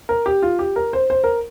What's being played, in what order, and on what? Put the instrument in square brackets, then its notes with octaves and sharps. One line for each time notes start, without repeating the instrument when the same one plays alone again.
[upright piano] A#4
G4
F4
G4
A#4
C5
C5
A#4